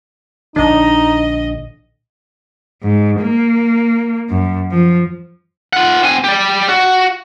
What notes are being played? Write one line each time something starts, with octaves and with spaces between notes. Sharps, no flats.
A#1 D3 D4 D#4 D#5
G#2
A#3
F#2
F3
F4 F#5
C4 G#5
G4 D5
F#4